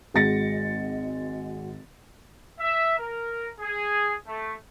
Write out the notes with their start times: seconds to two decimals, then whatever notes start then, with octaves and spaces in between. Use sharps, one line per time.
0.14 G#1 G#3 F#4 A6 A#6 C#7
2.60 E5
2.99 A#4
3.59 G#4
4.27 A3